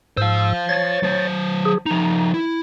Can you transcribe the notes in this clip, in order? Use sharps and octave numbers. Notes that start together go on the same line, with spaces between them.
G#2 C5 F5 E6
C#5 A6
F#3 C5
G#4
F3 D#4 A#5
E4